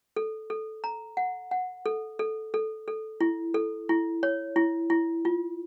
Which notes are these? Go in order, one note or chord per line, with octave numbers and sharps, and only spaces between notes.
A4
A4
A#5
F#5
F#5
A4
A4
A4
A4
E4
A4
E4
C#5
E4
E4
F4